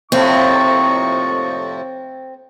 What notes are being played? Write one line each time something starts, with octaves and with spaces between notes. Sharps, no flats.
F2 A2 C3 A#3 C4 D#4 C#6